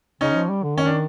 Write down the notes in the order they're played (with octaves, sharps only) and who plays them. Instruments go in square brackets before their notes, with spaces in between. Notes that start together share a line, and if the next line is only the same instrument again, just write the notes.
[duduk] C#3 [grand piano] C#4 D#4
[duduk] F3
G3
D3
[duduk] D#3 [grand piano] C#4
[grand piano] D4